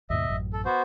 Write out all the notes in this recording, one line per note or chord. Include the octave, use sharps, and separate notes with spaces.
D#2 G#2 B2 D#5 E5
A1 F#2
A4
B3 F#4 C5